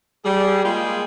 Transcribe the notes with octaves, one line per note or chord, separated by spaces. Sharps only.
G3 G#4
G3 G#3 A#3 F4 G#4 G5